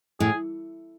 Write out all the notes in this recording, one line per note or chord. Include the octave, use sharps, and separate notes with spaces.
A2 G#4